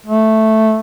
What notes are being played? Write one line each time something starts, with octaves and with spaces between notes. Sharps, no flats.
A3